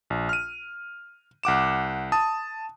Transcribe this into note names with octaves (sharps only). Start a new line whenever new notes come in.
A#1
F6 D#7
C2 F#5 D6 E7
A5 D#6